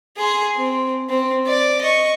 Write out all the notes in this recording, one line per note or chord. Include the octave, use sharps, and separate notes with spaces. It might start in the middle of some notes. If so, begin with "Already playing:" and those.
G#4 C6
C4
C4
D5
D#5 C#6